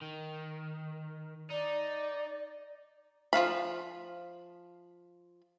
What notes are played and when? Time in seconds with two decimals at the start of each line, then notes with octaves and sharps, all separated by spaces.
0.02 D#3
1.50 D#4 D5
3.33 F3 F#3 F5 B5